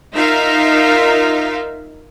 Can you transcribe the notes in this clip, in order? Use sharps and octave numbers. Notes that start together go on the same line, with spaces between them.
D#4 F4 A#4 E5 F5